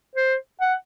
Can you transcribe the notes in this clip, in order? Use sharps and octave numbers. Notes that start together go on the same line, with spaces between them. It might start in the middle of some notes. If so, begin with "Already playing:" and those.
C5
F#5